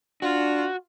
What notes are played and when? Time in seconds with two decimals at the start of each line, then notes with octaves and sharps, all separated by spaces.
0.22 D4 F4 F#4